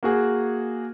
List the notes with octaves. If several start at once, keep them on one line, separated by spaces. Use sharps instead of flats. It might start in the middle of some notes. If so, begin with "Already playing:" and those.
A#3 F#4 G#4